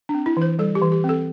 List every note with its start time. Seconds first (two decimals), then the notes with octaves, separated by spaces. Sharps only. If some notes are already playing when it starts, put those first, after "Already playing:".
0.09 D4
0.14 C4
0.26 E4
0.37 E3 C5
0.59 G3 A4
0.75 G4
0.82 E3
0.92 G4
1.04 C4
1.09 A4